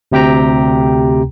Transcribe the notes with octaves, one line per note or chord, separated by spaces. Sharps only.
D2 C3 G4 G5 A#5